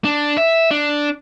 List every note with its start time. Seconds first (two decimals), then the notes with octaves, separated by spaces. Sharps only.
0.05 D4
0.37 E5
0.71 D4